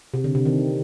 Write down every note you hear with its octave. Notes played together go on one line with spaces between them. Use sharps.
C3
D3
C3
D#3